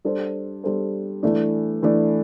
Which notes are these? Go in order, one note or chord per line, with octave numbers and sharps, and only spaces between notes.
G3 D4 A4 C5
G3 D4 A4 C5
E3 A3 D4
E3 A3 D4